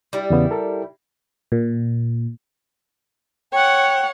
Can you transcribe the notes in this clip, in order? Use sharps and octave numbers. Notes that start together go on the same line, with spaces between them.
G3 E4
E2 C#3 B3
A4 A#4
A#2
C#5 F#5 G5